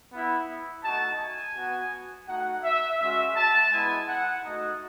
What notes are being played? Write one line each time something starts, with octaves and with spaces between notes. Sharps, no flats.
B3 E4
A3 D#4 F#4 A5
G#5
B3 F#4
A3 D#4 F#4 F#5
E5
G#3 C#4 F#4 E5
A5
G#3 B3 E4 G#5
F#5
A3 D#4 F#4 D#5